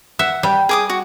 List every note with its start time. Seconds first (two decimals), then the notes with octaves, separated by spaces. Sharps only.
0.19 E5 F#5
0.43 G3 G5
0.69 G#4 D6 D#6
0.90 F#4